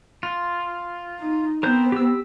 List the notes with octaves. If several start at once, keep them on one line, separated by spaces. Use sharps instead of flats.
F4
D#4
B3 C4 A#4 C5 G6
G4 E6